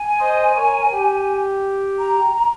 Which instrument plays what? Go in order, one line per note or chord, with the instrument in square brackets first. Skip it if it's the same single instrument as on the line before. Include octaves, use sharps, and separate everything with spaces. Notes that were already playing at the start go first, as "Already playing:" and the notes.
Already playing: [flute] G#5
[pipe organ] C5 D#5
A#4 C#5
G4
[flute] A#5